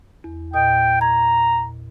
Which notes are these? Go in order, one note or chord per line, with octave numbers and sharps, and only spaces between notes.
E2
A#2 D#5 G5 D#6
A#5 G#6